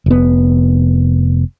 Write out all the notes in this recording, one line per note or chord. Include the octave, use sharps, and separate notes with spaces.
F1 B3